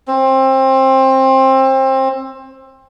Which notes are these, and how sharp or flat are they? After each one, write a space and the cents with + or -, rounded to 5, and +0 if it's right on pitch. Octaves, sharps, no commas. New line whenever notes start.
C4 +25